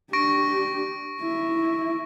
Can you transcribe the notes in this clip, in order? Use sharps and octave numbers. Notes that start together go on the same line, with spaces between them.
D4 G4 C#6 A#6 D7
E4